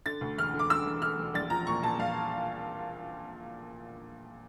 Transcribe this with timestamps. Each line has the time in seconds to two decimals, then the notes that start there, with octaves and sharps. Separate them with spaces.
0.06 D3 A6
0.21 D2
0.38 E1 F6
0.54 D3
0.59 D6
0.70 D3 E6
0.86 E1
1.02 D3 F6
1.19 E1
1.34 A#1 A6
1.50 F3 A#5
1.67 A#2 C#6
1.83 A#2 A5
1.99 A#1 F5